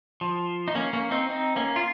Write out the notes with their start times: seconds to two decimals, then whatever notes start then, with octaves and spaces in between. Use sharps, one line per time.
0.21 F3
0.68 D#4
0.75 A#3 C#4
0.93 A#3 C#4
1.11 C4 D#4
1.29 C4 D#4
1.56 A#3 C#4
1.76 F4